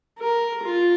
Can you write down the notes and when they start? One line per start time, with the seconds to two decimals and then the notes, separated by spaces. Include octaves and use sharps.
0.19 A#4
0.64 F4